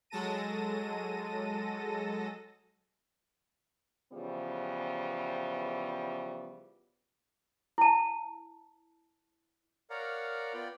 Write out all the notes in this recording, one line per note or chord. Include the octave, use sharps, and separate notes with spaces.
F#3 G#3 A4 A5 A#6 D#7
C#3 E3 F3 G3 B3
E4 A5
A#4 C#5 D5 F5 F#5 A#5
B3 F4 D5 G5 B5